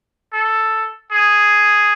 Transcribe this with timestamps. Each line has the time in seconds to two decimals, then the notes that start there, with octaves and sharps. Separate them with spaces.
0.33 A4
1.12 G#4